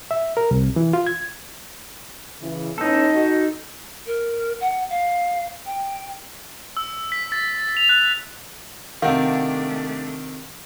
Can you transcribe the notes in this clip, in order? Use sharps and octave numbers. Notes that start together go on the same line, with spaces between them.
E5
A#4
C2
E3
F4
G#6
C#3 E3
A2 B3 C#4 D#4 A4
F#4 D#5
A#4
F#5
F5
G5
E6
B6
A6
F7
F#6
C3 D#3 A3 D4 F5 F#5